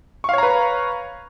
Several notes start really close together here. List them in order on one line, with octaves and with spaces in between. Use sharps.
C#6 F5 C#5 A#5 B4